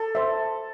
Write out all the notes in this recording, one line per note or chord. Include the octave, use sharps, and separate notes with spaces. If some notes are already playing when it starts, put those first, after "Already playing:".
Already playing: A4
C5 E5